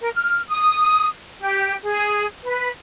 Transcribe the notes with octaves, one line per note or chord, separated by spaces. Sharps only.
A#4
F6
D#6
G4
G#4
B4